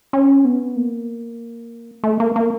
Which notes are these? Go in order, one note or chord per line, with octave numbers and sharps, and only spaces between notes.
C#4
B3
A#3
A3
A#3
A#3